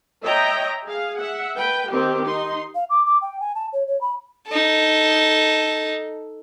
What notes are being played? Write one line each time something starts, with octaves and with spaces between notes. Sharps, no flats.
C#5 D#5 E5 G5 A#5
G#4 F5
E5 F#5
B4 G5
D#3 C4 G4
D#4 C6
F5
D6
D6
G5
G#5
A5
C#5
C#5
B5
D#4 A4